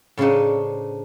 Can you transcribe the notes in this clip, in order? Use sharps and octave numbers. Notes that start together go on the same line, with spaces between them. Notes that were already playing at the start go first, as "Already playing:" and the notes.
A2 C#3 C4 D4 D#4